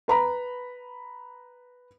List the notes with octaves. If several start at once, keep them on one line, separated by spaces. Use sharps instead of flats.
B4 A#5 B5